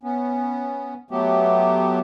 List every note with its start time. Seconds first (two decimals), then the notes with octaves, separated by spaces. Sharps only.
0.03 B3 C#4
1.11 F#3 A3 B3 G4